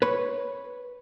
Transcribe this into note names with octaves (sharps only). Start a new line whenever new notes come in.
B4 C#5 B5